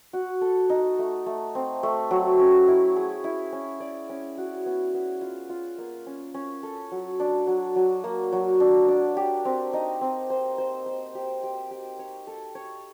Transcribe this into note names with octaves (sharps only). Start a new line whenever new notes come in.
F#4
A4
D#4
A3
A3
C4
A3
F#3
C#4
E4
G#4
E4
C#4
D5
C#4
F#4
B3
B3
F4
F4
A#3
C#4
C#4
A4
F#3
D4
F#3
F#3
A#3
F#3
D4
D4
G4
C4
D#4
C4
C5
C5
C5
G4
G4
G4
C#5
A4
C#5